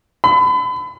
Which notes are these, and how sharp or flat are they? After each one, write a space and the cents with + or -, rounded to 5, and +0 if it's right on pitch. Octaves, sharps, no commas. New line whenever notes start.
B5 +35